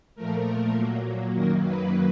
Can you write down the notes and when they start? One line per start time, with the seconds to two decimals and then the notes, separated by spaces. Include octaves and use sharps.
0.16 A#2 F3 A3 A#4
0.76 A#2 F#3 A#3
1.34 F#2 D#3 F#3 A#3 A#4
1.63 B4